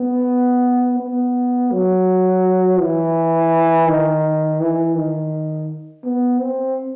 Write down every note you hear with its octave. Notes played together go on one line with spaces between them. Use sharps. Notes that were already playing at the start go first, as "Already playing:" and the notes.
Already playing: B3
B3
F#3
E3
D#3
E3
D#3
B3
C4